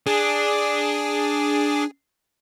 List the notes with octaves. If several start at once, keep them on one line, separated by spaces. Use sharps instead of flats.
D4 G#4